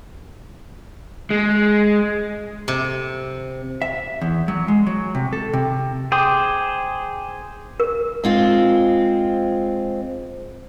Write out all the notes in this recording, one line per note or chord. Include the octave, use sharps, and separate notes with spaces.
G#3
C3
E5
E2
F#3
G#3
F#3
C3
A4
C3
G#4 C5 G5 D6 D#6
A#4
G#3 C4 F4